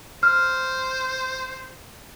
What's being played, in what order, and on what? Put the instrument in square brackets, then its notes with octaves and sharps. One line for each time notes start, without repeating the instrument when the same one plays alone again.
[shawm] C5 [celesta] F6